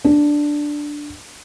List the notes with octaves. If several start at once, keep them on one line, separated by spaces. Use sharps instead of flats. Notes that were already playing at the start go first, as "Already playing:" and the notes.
D4